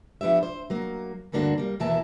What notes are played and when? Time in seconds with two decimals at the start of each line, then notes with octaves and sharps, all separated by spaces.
0.21 F3 B3 D4 G4 E5
0.43 C5
0.70 F#3 A#3
1.32 D2 G2 D3 A#3 D4 F#4
1.58 G3 A#3
1.80 D#2 B2 E3 A#3 E5 A5